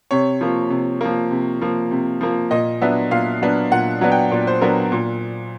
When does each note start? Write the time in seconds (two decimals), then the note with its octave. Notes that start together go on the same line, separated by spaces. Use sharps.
0.11 C3 C#5
0.41 F3 A#3
0.70 C3
1.01 F3 A#3
1.31 C3
1.61 F3 A#3
1.91 C3
2.21 F3 A#3
2.51 A#2 D#5
2.81 F#3 B3 D4 E5
3.11 A#2 F5
3.42 F#3 B3 D4
3.71 A#2 F#5
4.01 F#3 B3 D4
4.12 G5
4.31 A#2 D5
4.47 C5
4.61 F#3 B3 D4 A#4
4.92 A#2